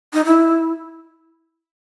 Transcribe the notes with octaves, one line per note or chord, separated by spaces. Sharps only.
D#4
E4